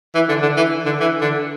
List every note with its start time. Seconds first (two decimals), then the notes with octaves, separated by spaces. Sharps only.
0.15 E3
0.29 D3
0.42 D3
0.57 E3
0.85 D3
1.00 E3
1.21 D3